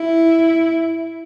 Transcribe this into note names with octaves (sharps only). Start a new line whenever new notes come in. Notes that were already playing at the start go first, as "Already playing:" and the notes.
Already playing: E4